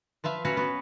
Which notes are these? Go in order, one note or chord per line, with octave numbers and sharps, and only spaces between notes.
F3 B4 E5 F5
F#3 C#4 F#4 B4 F5
B3 F#4